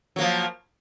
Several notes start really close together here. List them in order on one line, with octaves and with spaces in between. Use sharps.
F#3 A#3 F3